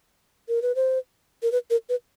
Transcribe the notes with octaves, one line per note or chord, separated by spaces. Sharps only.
A#4
B4
C5
A#4
B4
A#4
B4